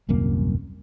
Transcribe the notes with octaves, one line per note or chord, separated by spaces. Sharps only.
D#1 C2 F#2 A#3